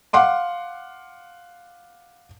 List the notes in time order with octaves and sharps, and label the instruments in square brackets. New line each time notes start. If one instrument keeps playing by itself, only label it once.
[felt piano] F5 F#5 C6 D6